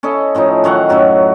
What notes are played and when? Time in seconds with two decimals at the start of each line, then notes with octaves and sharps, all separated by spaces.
0.03 C#4 E4 A4 D#5
0.35 A2 F3 C#4 D#4
0.64 D#3 F#3 F5 F#5
0.89 F#2 A2 F#3 F#4